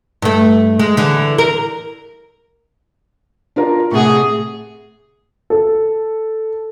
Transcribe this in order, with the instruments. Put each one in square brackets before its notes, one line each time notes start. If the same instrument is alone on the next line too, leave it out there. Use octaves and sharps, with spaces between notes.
[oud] G2 A3
G#3
D3 E3
A#4
[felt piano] D4 F4 A#4
[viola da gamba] A2 C3 G#4 [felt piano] F#5 C#6
[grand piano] A4